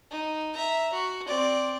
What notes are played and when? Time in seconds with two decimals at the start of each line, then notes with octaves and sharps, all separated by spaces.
0.11 D#4
0.54 E5 A#5
0.93 F#4
1.27 C4 D5